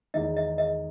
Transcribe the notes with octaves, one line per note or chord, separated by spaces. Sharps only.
E2 D#3 G#3 D#4 D#5
D#5
D#5